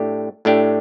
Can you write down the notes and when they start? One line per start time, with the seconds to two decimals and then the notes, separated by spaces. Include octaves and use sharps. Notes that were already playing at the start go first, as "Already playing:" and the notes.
Already playing: A2 A3 D4 G4
0.45 A2 A3 D4 G4